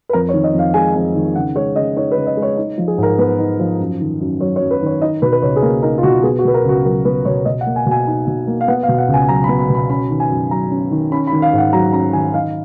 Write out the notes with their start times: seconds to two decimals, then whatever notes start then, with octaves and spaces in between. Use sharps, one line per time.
0.09 B4
0.13 F2 A#4
0.29 C#5
0.34 D#3
0.44 D#5
0.54 F2 F5
0.74 G#3 G#5
0.94 F2 G#5
1.15 D#3
1.35 C#3 F#5
1.55 G#3 C#5
1.76 C#3 D#5
1.96 D#4 C#5
2.11 B4
2.17 C#3
2.27 D#5
2.37 G#3
2.42 C#5
2.57 D#4
2.78 F3
2.88 G#4
2.98 G#2 A#4
3.18 B3 B4
3.38 D#4
3.59 F3
3.80 F#2
4.00 D#3
4.20 F#2
4.41 F#3 C#5
4.56 C#5
4.61 F#2
4.71 B4
4.81 D#3 C#5
5.02 D#4 D#5
5.22 B2 B4
5.32 B4
5.42 C#2 C#5
5.56 G#4
5.62 A#3 A#4
5.83 D#4 A#4
5.98 F4
6.03 B2 F#4
6.23 B3 G#4
6.39 F#4
6.44 B2 B4
6.54 A#4
6.65 C#2 F#4
6.84 F#3 A#4
7.05 B3 B4
7.25 B2 C#5
7.45 B2 D#5
7.61 F#5
7.66 A#3
7.76 G#5
7.86 B2
7.91 G#5
8.07 D#4
8.27 B2
8.47 A#3
8.61 F5
8.68 B3 F#5
8.83 F5
8.88 B2
8.98 F#5
9.08 C#2
9.14 G#5
9.29 F#3 A#5
9.44 B5
9.49 B3
9.59 B5
9.69 B2
9.75 B5
9.89 C#4 B5
10.10 D#3
10.20 G#5
10.30 F#2
10.51 F#3 A#5
10.71 C#4
10.91 D#3
11.12 C#4 B5
11.27 B5
11.32 D#3
11.42 F5
11.53 G#2
11.58 F#5
11.73 F#3 A#5
11.93 C#4 A#5
12.13 D#3 G#5
12.34 D#4 F5